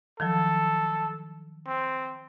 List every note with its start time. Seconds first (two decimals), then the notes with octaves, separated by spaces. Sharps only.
0.20 D#3 F3 F#3 A4
1.67 C4